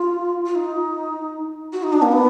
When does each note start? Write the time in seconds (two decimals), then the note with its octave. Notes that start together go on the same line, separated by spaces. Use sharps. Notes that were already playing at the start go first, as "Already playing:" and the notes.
Already playing: F4
0.46 F4
0.55 D#4
1.73 F#4
1.83 D#4
1.93 D4
2.02 A#3
2.12 B3